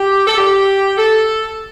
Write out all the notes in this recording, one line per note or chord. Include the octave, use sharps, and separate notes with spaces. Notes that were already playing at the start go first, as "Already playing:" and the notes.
Already playing: G4
A4
G4
A4